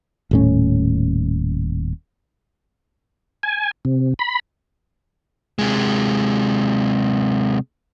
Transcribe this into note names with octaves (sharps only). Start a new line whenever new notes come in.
D#1 A2 C#4
G#5
C3
B5
C3 G#3